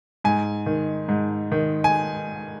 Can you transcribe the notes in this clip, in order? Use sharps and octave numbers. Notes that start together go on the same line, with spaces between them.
G#2 G#5
D#3
G#2
D#3
G#5